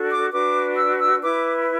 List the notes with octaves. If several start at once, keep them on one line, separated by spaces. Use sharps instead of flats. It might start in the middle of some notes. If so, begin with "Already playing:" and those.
Already playing: D4 F#4 A4
D6
D4 F#4 B4 D6
E6
E6
E4 B4 D6